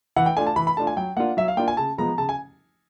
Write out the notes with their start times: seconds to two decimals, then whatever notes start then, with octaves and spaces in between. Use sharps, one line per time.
0.16 E3 F#5
0.26 G5
0.37 A3 D4 F4 G#5
0.47 A5
0.56 E3 B5
0.67 B5
0.77 A3 D4 F4 A5
0.87 G#5
0.96 F#3 G5
1.17 A#3 D4 F4 F#5
1.37 F#3 E5
1.48 F5
1.57 A#3 D4 F4 G5
1.68 G#5
1.77 C#3 A5
1.98 F3 G#3 B3 A#5
2.18 C#3 A5
2.29 G#5